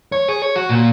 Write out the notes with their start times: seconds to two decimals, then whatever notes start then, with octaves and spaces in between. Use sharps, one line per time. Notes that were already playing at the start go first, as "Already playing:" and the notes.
0.12 C#5
0.28 G#4
0.42 C#5
0.56 F#4
0.69 A#2